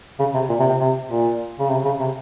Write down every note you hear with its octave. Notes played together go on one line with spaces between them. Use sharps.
C#3
C3
A#2
C3
C3
C3
A#2
C#3
C3
C#3
C3